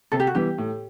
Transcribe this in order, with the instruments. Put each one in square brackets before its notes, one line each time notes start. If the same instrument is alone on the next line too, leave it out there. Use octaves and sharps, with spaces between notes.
[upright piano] C3 [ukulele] A4
[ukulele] G4
F#4
[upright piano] E3 G3 B3 [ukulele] G4
[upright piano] A2